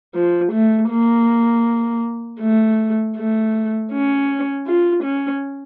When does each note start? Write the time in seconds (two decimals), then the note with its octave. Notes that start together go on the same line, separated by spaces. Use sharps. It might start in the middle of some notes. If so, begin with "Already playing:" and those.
0.15 F3
0.53 A3
0.90 A#3
2.40 A3
3.16 A3
3.92 C#4
4.66 F4
5.04 C#4